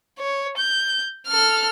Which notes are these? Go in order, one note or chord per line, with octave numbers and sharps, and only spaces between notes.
C#5
G6
A4 F6